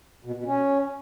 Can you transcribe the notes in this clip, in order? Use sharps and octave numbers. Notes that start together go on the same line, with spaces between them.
B2
B2
C#4